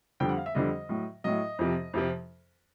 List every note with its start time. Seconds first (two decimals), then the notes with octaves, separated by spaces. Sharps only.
0.20 F2 D3 G3 G5
0.29 F#5
0.37 F5
0.46 E5
0.55 F2 D3 G3 D#5
0.89 A2 F#3
1.24 A2 F#3 D#5
1.59 F2 C3 F3
1.94 F2 C3 F3